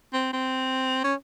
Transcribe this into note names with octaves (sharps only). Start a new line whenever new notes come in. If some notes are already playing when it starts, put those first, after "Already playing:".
C4
C4
C#4